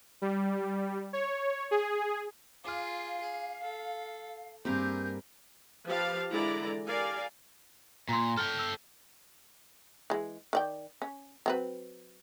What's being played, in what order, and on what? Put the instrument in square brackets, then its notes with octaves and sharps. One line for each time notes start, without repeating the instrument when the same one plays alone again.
[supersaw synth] G3
C#5
G#4
[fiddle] F4 G#4 [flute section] F5 [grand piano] D6 F6
[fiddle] G#4
A4
[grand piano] G2 A#3 [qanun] C4 G4 F5 [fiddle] G#4 A#4 [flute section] G6
[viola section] F3 G4 B4 F5 A5
D3 E3 G#3 E4 D5 A#5
G4 A#4 D5 F5 G#5
[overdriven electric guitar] A#2 [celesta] A#5 C6
[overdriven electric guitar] A4 G5 [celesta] F6
[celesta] E6
[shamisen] E3 G#3
D#3 D5 G5
C#4
F#3 C4 B4